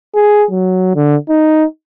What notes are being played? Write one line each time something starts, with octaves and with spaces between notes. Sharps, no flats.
G#4
F#3
D3
D#4